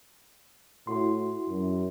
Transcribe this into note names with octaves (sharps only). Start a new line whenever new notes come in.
A2 E4 F#4 C6
F#2